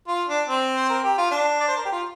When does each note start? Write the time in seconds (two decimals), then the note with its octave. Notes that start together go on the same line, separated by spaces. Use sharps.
0.08 F4
0.28 D4
0.48 C4
0.76 C5
0.90 A#4
1.04 G4
1.18 F4
1.31 D4
1.60 D5
1.68 C5
1.77 A#4
1.85 G4
1.92 F4